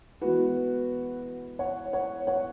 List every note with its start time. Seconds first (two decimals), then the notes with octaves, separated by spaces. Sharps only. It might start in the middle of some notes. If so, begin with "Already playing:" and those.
0.21 E3 G#3 B3 E4 F#4 B4
1.59 C#5 F#5
1.93 C#5 F#5
2.27 C#5 F#5